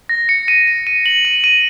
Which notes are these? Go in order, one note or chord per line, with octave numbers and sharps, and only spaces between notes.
A#6
C#7
D#7
D#7
D#7
F#7
D#7
D#7